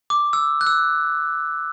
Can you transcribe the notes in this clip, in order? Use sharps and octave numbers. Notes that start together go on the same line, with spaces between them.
D6
E6
F#6
E6